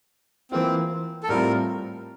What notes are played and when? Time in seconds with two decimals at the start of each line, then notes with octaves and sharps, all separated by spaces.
0.52 E3 A#3 C4 F4
1.23 A4
1.29 A2 G3 C4 F4 A#4